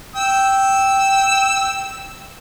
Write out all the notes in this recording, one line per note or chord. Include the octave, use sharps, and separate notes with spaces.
G5 E6